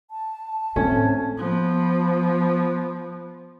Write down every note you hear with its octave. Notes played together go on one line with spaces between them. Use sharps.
A5
A2 A3 C4 C#4
F3 B3